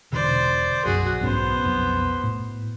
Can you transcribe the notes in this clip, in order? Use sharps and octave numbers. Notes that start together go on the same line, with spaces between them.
E1 B2 D3 C5 D5
B1 F#2 F#4 G#4
B1 G#2 B3 C#4 C5
B1 F2
A2